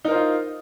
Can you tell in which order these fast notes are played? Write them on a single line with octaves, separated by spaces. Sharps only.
D#4 A#4 C5 F4